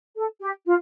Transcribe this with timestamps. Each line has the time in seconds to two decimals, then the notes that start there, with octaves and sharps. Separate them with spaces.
0.15 A4
0.41 G4
0.65 F4